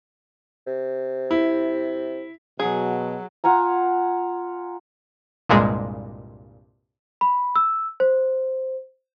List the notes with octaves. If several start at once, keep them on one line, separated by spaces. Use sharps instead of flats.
C3
E4
B2 F#3 G#4
F4 F#5 G#5 A#5
C2 G2 A#2 G#3
B5
E6
C5